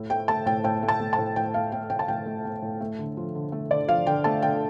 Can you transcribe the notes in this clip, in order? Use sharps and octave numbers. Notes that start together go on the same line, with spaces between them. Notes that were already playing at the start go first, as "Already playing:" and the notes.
Already playing: A2
A3 G5
A3 A5
A2 G5
A2 G5
A3
A5
A3
A5
A2
A2 G5
A3 F5
A3 G5
A2 G5
A5
A2 G5
A3
A3
A2
A3
D3
F3
D3
A3
D3 D5
F3 F5
D3 G5
A3 A5
D3 G5